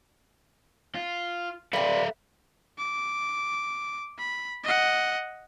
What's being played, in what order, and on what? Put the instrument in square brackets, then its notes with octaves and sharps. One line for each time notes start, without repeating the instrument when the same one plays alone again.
[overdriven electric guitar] F4
[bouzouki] G3 C4 [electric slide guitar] A4 E5 F5 [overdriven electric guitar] B4
[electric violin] D6
B5
D#5 F#5